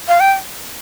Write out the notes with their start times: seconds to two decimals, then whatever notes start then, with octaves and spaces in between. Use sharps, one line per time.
0.08 F5
0.20 G5